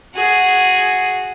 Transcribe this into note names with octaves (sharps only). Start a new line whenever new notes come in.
F#4 G#4